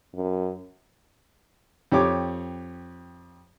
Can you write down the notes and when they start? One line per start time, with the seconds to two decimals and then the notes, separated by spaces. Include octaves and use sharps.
0.15 F#2
1.92 F2 G4 C#5 D6